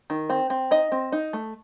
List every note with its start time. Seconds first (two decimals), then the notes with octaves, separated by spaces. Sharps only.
0.10 D#3
0.30 C4
0.50 C4
0.71 D#4 D#5
0.92 C4
1.12 D#4
1.33 A3